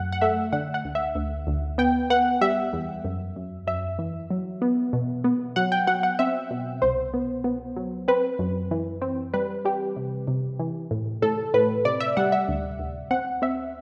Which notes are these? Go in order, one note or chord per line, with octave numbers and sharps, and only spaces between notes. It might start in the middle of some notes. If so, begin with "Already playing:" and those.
Already playing: F#2 F#3 A3 F#5
F#5
A3 E5
D3 F#5
F#5
D2
E5
D2
D2
B3 G5
B3 F#5
G3 E5
E2
F#2
F#2
F#2 E5
E3
F#3
B3
B2
B3
F#3 F#5
G5
F#3 F#5
F#5
C4 E5
B2
C2 C5
B3
B3
F#3
C4 B4
F#2
E3
C4
G3 B4
G3 G4
C3
C3
E3
A2
A2 A4
A2 B4
C3 D5
E5
G3 F#5
E5
D2
D2
C4 F#5
C4 E5